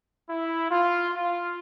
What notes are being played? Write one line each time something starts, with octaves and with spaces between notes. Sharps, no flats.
E4
F4
F4